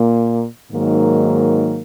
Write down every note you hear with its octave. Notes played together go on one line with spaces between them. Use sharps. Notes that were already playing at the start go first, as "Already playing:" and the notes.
Already playing: A#2 A#3
G#2 D#3 F#3 A#3